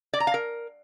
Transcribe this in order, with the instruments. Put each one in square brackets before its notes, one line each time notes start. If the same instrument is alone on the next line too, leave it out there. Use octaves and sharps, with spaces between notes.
[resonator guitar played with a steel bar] D5
A#5
F5
A#4